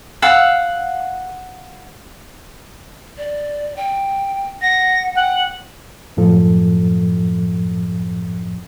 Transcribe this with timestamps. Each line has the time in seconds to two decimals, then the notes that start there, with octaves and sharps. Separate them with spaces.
0.22 F5 F#5 E6
3.18 D5
3.77 G5
4.62 F#5 A#6
5.15 F#5 G5
6.17 F#2 A2 F3 A4